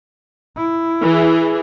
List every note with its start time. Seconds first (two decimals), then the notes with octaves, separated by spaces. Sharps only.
0.56 E4
1.02 E3 G#4